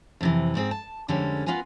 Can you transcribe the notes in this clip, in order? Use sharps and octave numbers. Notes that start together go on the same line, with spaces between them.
F2 C3 E3
G#2 C4 G#4
A5
F2 D3 G3 G#3 C#4
B3 F4 A#4 B4 G#5